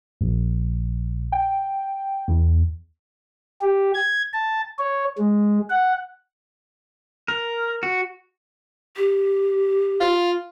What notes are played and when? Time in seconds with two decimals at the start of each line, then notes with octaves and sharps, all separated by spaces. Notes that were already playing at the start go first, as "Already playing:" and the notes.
0.21 A#1
1.32 G5
2.28 E2
3.61 G4
3.94 G#6
4.33 A5
4.79 C#5
5.18 G#3
5.70 F#5
7.28 A#4
7.83 F#4
8.97 G4
10.01 F4